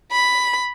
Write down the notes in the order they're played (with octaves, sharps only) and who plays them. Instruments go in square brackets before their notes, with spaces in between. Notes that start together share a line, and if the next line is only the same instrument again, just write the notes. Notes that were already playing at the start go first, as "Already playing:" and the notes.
[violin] B5